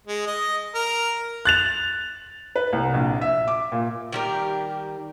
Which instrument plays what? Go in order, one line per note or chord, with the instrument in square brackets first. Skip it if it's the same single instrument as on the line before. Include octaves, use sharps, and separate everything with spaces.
[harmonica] G#3
D#5
A#4
[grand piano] F#6 A6 F7
[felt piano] B4
C2
A#1
E5
D6
A#2
[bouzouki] D#3 G3 A#4 [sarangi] G4